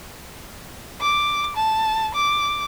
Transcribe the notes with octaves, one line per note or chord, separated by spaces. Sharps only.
D6
A5
D6